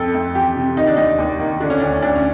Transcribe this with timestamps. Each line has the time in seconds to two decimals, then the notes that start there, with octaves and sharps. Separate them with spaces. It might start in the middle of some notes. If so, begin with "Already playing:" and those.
Already playing: F2 A4
0.15 F2
0.35 E3 G4
0.56 C3
0.76 D#3 D#4
0.87 D4
0.97 D#2 D#4
1.18 D#2
1.40 D#3
1.60 D3 D4
1.70 C#4
1.80 D2 D4
2.02 D2 D4
2.15 C#4